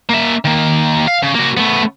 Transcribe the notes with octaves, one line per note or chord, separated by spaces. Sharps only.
A#3 E5
D#3 A#3
F5
C#3
A#3 F#4
A3 B3